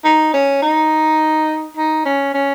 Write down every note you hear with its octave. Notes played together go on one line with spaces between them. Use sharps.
D#4
C#4
D#4
D#4
C#4
C#4